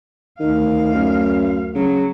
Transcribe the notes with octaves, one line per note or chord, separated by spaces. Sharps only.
D2 D#3 F5
F#2
C#3 F#3